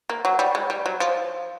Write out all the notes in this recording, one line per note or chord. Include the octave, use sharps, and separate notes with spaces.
A#3
F#3
G3
G#3
G3
F#3
F3